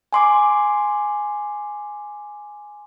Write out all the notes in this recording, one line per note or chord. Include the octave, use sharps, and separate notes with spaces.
G#5 C6 D6